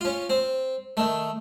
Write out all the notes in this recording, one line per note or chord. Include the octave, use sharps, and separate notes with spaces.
C#4 F4
C4
D#3 A3